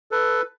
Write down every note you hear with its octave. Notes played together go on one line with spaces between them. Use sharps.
A4 B4